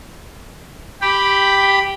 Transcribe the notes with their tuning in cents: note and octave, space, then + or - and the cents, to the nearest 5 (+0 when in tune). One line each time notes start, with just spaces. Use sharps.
G4 +0 G5 +0 B5 +5